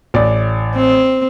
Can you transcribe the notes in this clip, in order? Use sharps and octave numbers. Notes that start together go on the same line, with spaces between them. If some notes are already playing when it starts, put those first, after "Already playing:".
A1 D5
C4